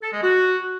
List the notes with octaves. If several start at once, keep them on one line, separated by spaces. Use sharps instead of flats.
A4
G#3
F#4